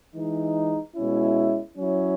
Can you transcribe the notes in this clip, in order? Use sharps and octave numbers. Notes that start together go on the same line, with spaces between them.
E3 G#3 D#4
B2 G#3 C#4 E4
F#3 C#4 E4